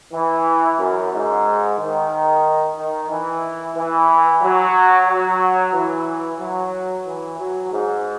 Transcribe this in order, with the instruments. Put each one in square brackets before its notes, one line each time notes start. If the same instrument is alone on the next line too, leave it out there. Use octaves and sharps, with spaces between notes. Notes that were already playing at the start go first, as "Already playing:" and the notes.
[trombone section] E3
F#2
G#2
D#3
D#3
E3
E3
F#3
F#3
E3
F#3
E3
F#3
G#2